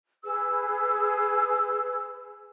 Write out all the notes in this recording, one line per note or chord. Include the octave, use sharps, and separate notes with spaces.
G#4 B4 E6